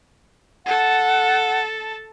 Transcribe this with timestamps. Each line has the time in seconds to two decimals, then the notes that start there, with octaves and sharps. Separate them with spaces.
0.66 A4 F#5 A5